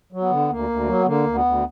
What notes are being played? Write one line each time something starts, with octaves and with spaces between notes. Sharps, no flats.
F#3
B3
D3
D2 A#3
D2
F#3
B3
D3 A#3
D2
B3
D2